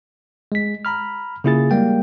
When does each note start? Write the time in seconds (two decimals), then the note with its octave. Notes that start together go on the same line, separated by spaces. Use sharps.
0.52 G#3 B6
0.85 A#5 B5 F6
1.44 C#3 A#3 E4 F4 G#4 A6
1.71 G3 G#3 A#3 G5